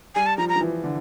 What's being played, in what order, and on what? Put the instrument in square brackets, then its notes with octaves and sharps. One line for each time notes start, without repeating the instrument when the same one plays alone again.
[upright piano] G3 [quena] G#5
[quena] A5
[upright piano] F3 [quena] A#5
[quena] A#5
[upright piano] F3
E3
D3